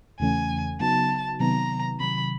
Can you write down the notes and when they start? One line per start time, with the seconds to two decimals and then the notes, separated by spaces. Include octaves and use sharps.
0.20 E2 C#3 E3 A3 C#4 G#5
0.80 C#3 F#3 B3 D#4 F#4 A5
1.40 C3 D#3 F#3 B3 D#4 A#5
2.00 C3 D#3 F#3 B5